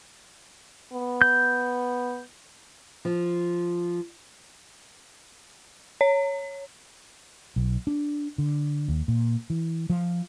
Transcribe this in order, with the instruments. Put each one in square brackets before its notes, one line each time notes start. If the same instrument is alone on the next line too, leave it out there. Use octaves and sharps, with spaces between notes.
[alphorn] B3
[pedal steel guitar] G6
[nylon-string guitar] F3
[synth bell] C#5
[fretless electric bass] B1
D4
D3
D#2
A#2
E3
F3